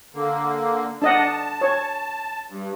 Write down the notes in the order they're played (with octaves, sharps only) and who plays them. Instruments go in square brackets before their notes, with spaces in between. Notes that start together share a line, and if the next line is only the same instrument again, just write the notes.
[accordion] D3 A#3
[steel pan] D4 D#5 F#5 [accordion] A5
[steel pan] C#5
[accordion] G2